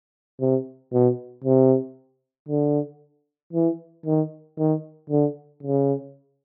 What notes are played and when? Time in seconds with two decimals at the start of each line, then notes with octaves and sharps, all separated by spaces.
0.40 C3
0.93 B2
1.44 C3
2.49 D3
3.53 E3
4.06 D#3
4.58 D#3
5.10 D3
5.63 C#3